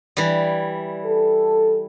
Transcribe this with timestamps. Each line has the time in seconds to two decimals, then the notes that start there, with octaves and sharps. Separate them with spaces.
0.17 E3 G3
1.05 A4